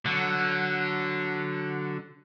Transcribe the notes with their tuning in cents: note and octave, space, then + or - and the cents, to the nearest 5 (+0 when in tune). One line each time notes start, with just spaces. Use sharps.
D3 +0 F#3 +0